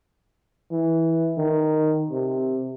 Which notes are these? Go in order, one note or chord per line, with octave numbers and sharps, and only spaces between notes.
E3
D#3
C3